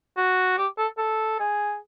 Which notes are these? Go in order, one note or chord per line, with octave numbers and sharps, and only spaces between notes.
F#4
G4
A4
A4
G#4